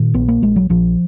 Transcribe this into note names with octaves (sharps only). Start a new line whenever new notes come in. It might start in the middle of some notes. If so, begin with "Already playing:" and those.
Already playing: A#2 D#3
A#1 B3
A#3
A#1 G#3
F#3
A#1 F3